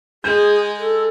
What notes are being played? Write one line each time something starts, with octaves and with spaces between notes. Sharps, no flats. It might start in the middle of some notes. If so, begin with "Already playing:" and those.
G#3 G#4 G6
A4